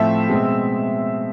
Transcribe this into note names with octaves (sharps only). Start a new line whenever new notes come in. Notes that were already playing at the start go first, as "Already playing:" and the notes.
Already playing: A2 F3 A3 C4 E5
B2 G#3 C4